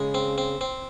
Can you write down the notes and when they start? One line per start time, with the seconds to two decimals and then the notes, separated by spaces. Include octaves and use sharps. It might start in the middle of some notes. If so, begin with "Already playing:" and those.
Already playing: C#3 G#3
0.14 C4
0.38 C4
0.61 C4